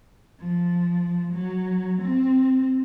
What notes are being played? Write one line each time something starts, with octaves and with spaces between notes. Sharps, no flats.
F3
F#3
C4